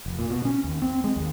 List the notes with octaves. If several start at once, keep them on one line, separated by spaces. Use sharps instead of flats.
F1
A#2
B2
C#4
D#2
C4
G#3
D#2